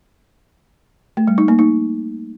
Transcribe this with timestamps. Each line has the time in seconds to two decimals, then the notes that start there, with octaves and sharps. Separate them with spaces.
1.17 A3
1.27 G3
1.38 D#4
1.48 A#3
1.59 D#4